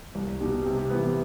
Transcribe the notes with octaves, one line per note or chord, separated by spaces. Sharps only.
C2
B2 G3 D#4 G4
C3
E3 G3 B3